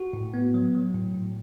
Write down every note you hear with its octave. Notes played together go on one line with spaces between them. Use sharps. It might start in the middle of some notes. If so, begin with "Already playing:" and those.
Already playing: F#4
A2
B3
F#3
F#3
A2
A2